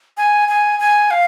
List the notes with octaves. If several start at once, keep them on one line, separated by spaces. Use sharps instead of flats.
G#5
G#5
G#5
F5